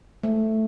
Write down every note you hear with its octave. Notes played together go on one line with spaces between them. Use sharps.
A3